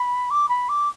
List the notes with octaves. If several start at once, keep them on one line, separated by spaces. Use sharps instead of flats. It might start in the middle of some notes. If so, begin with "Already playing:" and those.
Already playing: B5
D6
B5
D6